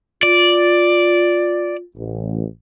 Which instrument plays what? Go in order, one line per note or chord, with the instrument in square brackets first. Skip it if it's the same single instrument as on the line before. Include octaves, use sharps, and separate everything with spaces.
[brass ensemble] F4 [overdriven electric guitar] D5
[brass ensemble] A1